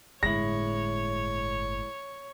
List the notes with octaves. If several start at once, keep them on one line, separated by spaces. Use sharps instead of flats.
G1 A2 G#3 E4 C#5 A#6